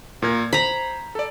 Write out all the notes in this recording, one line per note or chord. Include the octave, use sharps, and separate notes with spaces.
A#2 A#4 G#6
C5 A#5 B5
A4 D5